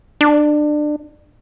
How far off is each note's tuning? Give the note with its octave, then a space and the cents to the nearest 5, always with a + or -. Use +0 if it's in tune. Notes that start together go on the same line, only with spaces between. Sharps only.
D4 +25